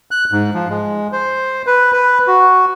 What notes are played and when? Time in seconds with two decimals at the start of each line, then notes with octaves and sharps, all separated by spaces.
0.11 F#6
0.32 G#2
0.54 F3
0.70 G#3
1.12 C5
1.67 B4
1.93 B4
2.27 F#4